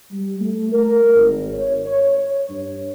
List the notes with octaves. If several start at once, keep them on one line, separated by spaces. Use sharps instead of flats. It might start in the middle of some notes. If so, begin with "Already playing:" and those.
G3
A3
A#4
G#1
C#5
C#5
C#5
G2